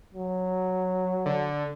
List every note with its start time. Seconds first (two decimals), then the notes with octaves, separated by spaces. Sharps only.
0.14 F#3
1.26 D3